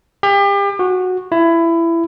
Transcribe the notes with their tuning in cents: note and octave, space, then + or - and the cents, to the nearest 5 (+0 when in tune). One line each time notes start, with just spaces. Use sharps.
G4 +35
F#4 -10
E4 +20